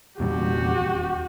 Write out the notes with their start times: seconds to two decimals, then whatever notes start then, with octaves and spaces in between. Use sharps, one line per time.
0.19 E2 A#2 G3 F#4 G4
0.81 D#1